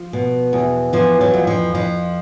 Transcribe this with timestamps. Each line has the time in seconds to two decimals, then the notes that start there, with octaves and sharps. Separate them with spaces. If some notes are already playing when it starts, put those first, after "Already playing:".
Already playing: F3
0.13 B2
0.53 E2
0.93 E3 F3
1.21 F#3
1.34 F2
1.47 F3
1.75 F2 F3